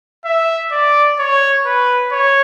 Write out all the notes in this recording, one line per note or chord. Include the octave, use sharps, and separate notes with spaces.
E5
D5
C#5
B4
C#5